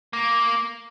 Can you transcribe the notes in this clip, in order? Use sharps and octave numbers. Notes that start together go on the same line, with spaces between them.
A#3